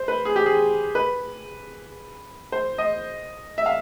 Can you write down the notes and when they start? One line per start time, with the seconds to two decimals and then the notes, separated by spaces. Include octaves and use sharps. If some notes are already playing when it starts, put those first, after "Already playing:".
Already playing: C5
0.08 B4
0.25 G#4
0.36 G4
0.46 G#4
0.95 B4
2.52 C5
2.78 D#5
3.58 E5
3.66 F5